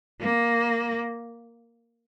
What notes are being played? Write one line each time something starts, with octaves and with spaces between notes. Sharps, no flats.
A#3